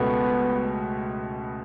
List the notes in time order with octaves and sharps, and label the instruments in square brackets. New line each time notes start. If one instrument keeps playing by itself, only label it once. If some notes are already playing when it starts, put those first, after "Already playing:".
Already playing: [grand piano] C#2 B2 A3 [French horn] B3